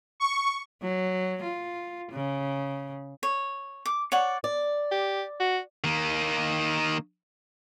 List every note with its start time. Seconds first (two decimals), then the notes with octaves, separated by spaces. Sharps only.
0.20 C#6
0.82 F#3
1.43 F4
2.12 C#3
3.23 C#5
3.86 D6
4.12 C#5 D5 F#5
4.44 D5
4.91 G4
5.40 F#4
5.84 D#3 A#3